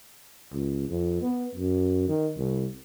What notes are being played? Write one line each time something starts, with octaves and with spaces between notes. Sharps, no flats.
C#2
F2
B3
F#2
D#3
C2